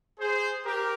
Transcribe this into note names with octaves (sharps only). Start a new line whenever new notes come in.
G#4 C5
G4 A#4